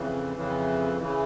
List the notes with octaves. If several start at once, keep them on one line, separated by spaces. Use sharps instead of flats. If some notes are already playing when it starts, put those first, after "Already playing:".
Already playing: F2 C#3 E3
F2 C#3 E3
C#3 E3